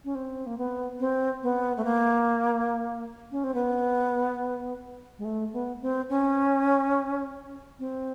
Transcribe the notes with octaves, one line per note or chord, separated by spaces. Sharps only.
C#4
C4
A#3
B3
C4
B3
A3
A#3
C#4
C4
B3
G#3
A3
B3
C4
C#4
C4